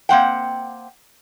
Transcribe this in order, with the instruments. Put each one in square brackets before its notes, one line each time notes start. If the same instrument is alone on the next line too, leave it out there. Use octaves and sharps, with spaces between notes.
[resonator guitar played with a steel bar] A#3 C4 F#5 G5